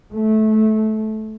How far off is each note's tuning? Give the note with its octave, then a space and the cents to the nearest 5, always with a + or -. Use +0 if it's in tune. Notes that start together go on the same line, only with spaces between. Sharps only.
A3 -20